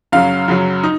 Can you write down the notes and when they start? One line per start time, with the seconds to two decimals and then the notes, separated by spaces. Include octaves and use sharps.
0.12 F#2 C#3 F#3 F5
0.48 F#2 C#3 F#3
0.83 D#4